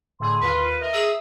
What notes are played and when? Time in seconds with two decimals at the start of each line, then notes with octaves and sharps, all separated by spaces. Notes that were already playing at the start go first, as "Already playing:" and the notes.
0.20 A2 D3 G#4 C6
0.41 D#2 F4 B4 B5
0.81 A#4 D#5 E5
0.93 G#4 D#6 E6